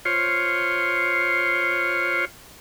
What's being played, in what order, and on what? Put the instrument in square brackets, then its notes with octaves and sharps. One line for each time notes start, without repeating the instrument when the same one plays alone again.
[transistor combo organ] F4 C5 C#5